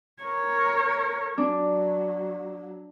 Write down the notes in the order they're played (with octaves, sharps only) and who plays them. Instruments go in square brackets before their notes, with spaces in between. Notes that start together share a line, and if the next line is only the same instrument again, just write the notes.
[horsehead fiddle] A#4 C#5
[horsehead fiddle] F#3 [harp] D4